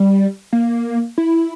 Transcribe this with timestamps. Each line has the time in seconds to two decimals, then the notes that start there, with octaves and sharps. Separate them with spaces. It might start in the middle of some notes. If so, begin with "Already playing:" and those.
Already playing: G3
0.53 A#3
1.18 E4